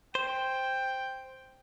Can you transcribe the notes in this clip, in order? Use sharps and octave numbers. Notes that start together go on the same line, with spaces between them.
C5 G5